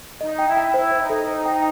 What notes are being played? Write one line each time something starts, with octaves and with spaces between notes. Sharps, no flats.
D#4 D#5
G5
E4
G5
E4 C5
C5
D#4
A4
C5
G5